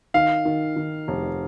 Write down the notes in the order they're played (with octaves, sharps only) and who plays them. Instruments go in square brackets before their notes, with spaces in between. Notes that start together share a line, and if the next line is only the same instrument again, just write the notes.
[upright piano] D#3 [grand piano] F5
[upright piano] D#3
D#3
F1